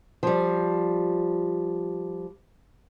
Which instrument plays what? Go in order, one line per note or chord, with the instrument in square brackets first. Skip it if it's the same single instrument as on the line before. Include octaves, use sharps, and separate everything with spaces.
[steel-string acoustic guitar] F3 G3